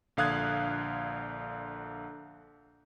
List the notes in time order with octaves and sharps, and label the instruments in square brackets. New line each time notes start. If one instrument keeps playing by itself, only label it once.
[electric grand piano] A#1 D3 F5 D#6 F#6 G#6